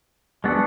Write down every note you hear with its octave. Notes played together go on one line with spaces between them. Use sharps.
G#3 B3 D4 F#4 A4